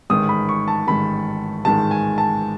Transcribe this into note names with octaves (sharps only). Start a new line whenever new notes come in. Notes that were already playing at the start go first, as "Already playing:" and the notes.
A1 G#2 D#3 G#3 D#6
B5
C#6
A5
A1 G#2 D#3 G#3 B5
A1 G#2 D#3 G#3 A5
G#5
A5